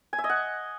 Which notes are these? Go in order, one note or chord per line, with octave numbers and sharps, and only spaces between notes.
G#5
E5
D#5
F#5